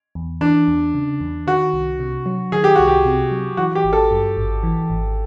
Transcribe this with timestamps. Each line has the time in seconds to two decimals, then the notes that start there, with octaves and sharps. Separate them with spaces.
0.15 E2
0.41 E3 D4
0.68 E2
0.94 C#3
1.21 E2
1.47 D#3 F#4
1.74 C2
2.00 C3
2.26 F#3
2.52 D#3 G#4
2.64 G4
2.75 C2 F#4
2.88 G4
3.05 C3
3.32 F#3
3.57 E3 F#4
3.75 G4
3.84 G#1
3.93 A4
4.11 G2
4.37 G#1
4.63 E3
4.90 G#1